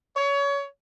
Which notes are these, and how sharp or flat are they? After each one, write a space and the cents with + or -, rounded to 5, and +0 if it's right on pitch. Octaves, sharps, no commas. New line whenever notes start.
C#5 +25